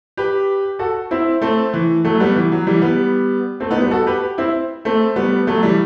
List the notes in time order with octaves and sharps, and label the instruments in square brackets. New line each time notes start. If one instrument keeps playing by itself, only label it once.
[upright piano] G4 B4
F#4 A4
C4 E4
A3 C4
E3
F#3 A3
G3 B3
E3
F#3
E3 G3
G3 B3
A3 C4
B3 D#4
G3 B3
F#4 A4
G4 B4
C4 E4
A3 C4
G3 B3
F#3 A3
E3 G3